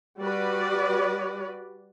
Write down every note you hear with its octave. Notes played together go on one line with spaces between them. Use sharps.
G3 F#4 B4 D5